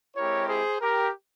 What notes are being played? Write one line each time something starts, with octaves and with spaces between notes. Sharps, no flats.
G#3 C4 E4 G4 A#4 C#5
G#4 C5
G4 A#4